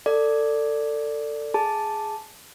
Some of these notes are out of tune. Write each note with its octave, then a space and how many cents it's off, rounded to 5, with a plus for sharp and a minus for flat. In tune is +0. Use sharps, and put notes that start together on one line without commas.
A4 +25 D5 +0
G#4 +0 A5 +0